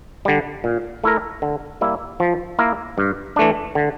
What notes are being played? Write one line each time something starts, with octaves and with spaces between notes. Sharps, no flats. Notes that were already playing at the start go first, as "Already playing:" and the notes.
D3 G3
A#2
A3 E4 A#4
D3
G3 A#3 E4
F3
A#3 E4 A#4
G2
E3 A3 D4
D3